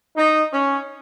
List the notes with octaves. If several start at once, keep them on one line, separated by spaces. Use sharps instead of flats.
D#4
C#4